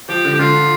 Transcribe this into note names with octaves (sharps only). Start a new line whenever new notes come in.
F3 G4
D3
G4
D3 F4